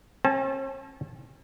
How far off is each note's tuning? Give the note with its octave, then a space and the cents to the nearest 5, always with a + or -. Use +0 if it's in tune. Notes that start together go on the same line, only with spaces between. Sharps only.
C#4 -45 A5 -25